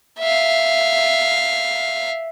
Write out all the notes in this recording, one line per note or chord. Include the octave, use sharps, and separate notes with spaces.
E5 F5